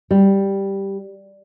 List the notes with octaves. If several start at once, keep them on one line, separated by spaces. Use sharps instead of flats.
G3